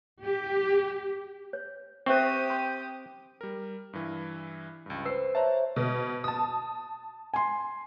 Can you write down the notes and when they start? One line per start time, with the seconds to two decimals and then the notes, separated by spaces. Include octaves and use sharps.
0.21 G4
1.53 C#5
2.06 C4 G4 C5 E5 C#6 D#6
2.50 C6
3.41 G3 A#4
3.93 G2 E3
4.86 C#2 G2
5.06 B4 C5 E6 C7
5.35 C5 C#5 E5 A5 A#5
5.76 B2
6.24 A5 D#6
7.34 G#5 C6